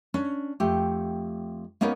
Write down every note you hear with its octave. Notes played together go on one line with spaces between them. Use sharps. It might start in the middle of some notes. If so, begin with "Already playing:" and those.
C#4 D4
F2 A3 G4
A#3 B3 C#4 D#4 A#4 B4